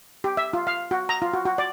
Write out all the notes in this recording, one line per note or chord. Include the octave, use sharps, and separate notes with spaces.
G4
E5
F4
F5
F#4
A#5
F4
F#4
F#4
D5